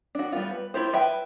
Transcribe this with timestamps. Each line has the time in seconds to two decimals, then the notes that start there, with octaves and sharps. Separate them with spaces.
0.15 D4 F#4
0.32 G3 B3 F4
0.51 B4
0.74 E4 F4 G4 C5
0.93 B4 E5 G5